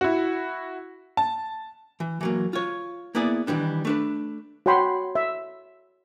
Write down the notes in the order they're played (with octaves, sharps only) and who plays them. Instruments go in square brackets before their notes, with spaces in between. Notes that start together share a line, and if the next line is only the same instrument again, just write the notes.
[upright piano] E4 F#4
A5
[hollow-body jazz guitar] E3
E3 F#3 A#3
F4 C#5
A#3 B3 E4 G#4 D5
D#3 E3 G3 D4
A3 D4 B4
[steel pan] F#4 C#5 F#5 G5 B5 C6
E5